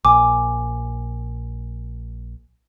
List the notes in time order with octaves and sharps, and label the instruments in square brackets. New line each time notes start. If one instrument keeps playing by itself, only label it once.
[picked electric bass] A#1 [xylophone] G#5 D6